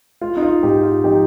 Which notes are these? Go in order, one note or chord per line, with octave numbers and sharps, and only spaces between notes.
G#3 F4
D#4
F4
G#2 D#4 G4
F4
F3 D#4 G4